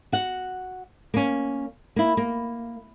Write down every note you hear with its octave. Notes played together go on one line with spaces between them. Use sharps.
F#4 F#5
A#3 C#4
A#3 E4
A#3